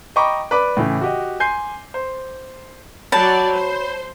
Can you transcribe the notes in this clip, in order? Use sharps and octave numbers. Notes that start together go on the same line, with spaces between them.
D#5 G5 A#5 B5 C#6 D6
B4 D5 B5 D6
A2 C#3 E3
F#4 G4 D#5
G#5 C6 G6 C7
C5
F#3 C#5 D5 A5 B5 G6
C5